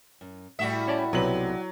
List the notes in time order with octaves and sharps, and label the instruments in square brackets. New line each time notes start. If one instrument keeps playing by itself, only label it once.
[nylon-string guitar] F#2
[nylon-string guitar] A2 [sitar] G3 F#4 E5
[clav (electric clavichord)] C#4 D5 A5
[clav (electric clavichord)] B1 C3 B4 [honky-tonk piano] F#3 F#7